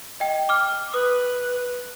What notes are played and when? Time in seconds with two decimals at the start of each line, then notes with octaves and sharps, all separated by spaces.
0.20 D#5 G5
0.49 D6 F6
0.94 B4 D#6